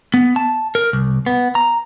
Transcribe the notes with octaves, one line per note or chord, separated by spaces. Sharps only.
B3
A5
A#4
C2
B3
A#5